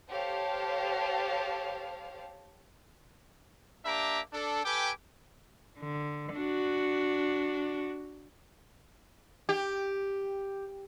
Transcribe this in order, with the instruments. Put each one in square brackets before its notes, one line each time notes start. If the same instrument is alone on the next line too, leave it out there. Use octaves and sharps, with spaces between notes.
[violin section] G4 A4 C5 C#5 F5 A5
[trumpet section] A#3 D4 G4 E5 A#5 D6
D4 A4
G4 A4 B4 G5 G#5 D6
[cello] D3
D4 F#4
[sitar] G4